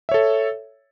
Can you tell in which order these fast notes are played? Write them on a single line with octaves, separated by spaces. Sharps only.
E5 C#5 A4